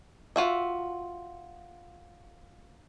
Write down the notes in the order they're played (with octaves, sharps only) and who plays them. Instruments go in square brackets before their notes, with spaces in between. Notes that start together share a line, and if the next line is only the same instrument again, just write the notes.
[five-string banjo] F4 F#4 E5